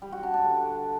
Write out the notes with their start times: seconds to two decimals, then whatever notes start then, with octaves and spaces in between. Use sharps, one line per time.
0.02 G3
0.12 F#4
0.23 D4
0.34 D4
0.44 D3